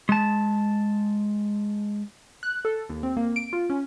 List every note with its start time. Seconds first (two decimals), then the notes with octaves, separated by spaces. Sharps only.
0.09 G#3 A5
2.43 F#6
2.65 A4
2.89 D#2
3.03 C4
3.17 A#3
3.36 D7
3.53 F4
3.70 C#4